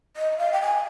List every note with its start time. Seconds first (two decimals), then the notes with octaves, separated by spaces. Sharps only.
0.16 D#5
0.38 F5
0.52 G5
0.61 G#5